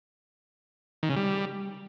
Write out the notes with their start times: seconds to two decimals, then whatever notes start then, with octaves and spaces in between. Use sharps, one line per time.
1.03 D#3
1.10 C#3
1.16 G3